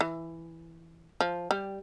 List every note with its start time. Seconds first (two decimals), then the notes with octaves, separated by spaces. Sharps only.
0.01 E3
1.21 F3
1.51 G3